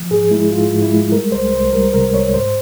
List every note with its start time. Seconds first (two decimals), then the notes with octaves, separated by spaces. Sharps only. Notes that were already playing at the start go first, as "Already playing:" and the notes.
Already playing: F3
0.11 G#2 G#4
0.31 G#3 E4
0.51 G#2 F4
0.72 G#2
0.82 E4
0.92 G#3
1.12 G3 A#4
1.32 C2 C5
1.53 C2 C5
1.73 G3 A#4
1.93 C3 A#4
2.14 C2 C#5
2.34 G#2 C5